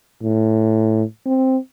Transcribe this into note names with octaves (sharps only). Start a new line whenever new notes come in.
A2
C4